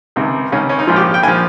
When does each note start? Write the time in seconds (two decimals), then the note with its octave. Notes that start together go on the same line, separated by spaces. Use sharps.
0.16 C#2 C3 D#3
0.52 C#2 C3 D#3 C#4
0.69 C#4
0.79 D#4
0.87 A#1 G#2 F3 F4
0.96 G4
1.14 G5
1.23 A#1 G#5
1.28 F3